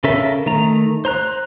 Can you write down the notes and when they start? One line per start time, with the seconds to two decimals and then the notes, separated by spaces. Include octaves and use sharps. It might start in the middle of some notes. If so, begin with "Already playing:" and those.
0.04 C#3 C#4 A4 A#4 E5
0.46 D#3 A3 A#5
1.05 C5 A#5 F#6